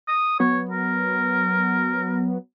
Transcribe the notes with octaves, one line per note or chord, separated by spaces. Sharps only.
D#6
F#3 B3 C#5
A#4